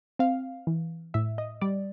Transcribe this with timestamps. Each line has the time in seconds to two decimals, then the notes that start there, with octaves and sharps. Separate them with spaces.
0.19 C4 F5
0.67 E3
1.14 A2 E5
1.38 D#5
1.61 G3 D5